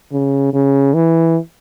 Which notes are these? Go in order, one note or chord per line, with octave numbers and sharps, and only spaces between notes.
C#3
C#3
E3